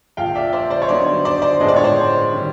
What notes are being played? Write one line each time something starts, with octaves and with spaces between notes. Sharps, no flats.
A#1 A#2 F3 F5 G5
D5 E5
C5 D5
C5 D5
C#5
G2 D3 F#3 B3 D#4 C5 D5
C5 D5
C5 D5
A2 F3 G#3 B3 D4 D#5
D5
C#5
C5 D5
D#3 G3